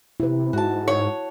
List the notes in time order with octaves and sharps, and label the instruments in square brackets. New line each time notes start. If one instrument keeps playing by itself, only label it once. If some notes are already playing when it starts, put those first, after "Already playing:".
[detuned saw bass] C3 [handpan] E4 B4
[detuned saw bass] G#2 [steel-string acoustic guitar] F#4 A5
[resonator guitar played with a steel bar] C#5